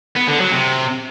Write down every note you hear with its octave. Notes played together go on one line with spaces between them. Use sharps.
B3
D3
F#3
C3